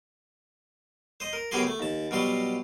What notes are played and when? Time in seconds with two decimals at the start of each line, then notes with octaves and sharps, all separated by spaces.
1.20 C5 D#5
1.33 A#4
1.51 F#2 C#3 B3 G4 G#4 C6
1.67 A3
1.80 D#2 A5
2.11 B2 F#3 G3 F4 C6